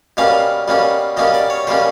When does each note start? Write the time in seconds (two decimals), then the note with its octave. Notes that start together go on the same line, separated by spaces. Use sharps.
0.17 B2 G3 A#3 C#4 F5
0.68 B2 G3 A#3 C#4
1.17 B2 G3 A#3 C#4 D#5
1.34 D5
1.50 C#5
1.67 B2 G3 A#3 C#4 C5